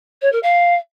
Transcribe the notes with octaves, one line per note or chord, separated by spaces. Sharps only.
C#5
A#4
F5